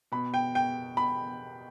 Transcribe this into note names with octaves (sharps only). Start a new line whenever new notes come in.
B2 B5
G5
G5
B5